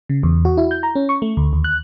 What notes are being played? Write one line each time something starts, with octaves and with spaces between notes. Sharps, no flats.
C#3
E2
F#4
E4
G6
A#5
C#4
C#6
A3
D2
D#2
F#6